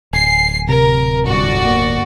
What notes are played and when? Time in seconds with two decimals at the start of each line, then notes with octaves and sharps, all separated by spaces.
0.13 D1 G#5 C7
0.69 C3 A#4
1.25 G1 F#4 D5
1.65 A#3